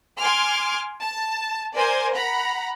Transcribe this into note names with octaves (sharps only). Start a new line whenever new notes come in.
G#5 C6 D6 F6
A5
A#4 C5 D5 G#5
F#5 A#5 B5